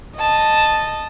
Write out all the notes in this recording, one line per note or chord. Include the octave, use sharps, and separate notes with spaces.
D#5 A5